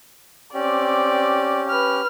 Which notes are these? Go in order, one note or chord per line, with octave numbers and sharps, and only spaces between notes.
C4 C#4 G4 D5
B4 F6